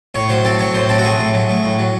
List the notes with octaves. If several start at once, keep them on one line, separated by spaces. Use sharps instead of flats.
A2 C#5
F#3 C5
C4 A4
F#3 C#5
A2 C5
C4 A4
F#4
A3 G#4
A2
F#3
A3
A2
F#3